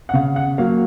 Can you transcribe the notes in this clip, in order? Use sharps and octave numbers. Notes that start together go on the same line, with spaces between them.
F#5
C#3 F5
F#5
F#3 A#3 F5